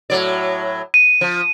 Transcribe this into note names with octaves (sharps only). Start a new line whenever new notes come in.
A2 F#3 D5
D#7
F3